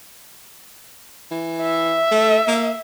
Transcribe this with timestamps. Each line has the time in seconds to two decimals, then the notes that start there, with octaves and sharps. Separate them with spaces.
1.31 E3
1.62 E5
2.12 A3
2.48 A#3